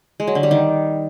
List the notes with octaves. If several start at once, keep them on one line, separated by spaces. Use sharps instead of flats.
G#3
F#3
D3
G3
D#3